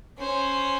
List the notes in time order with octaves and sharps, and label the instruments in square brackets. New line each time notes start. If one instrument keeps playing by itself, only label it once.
[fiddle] C#4 [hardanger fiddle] C5